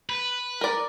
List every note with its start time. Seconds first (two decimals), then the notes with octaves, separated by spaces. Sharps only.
0.09 B4
0.61 A#4 D5